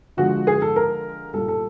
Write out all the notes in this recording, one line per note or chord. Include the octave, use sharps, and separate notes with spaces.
D3 F3 G#3 F#4
G#4
A4
A#4
A#2 G3 A4
A4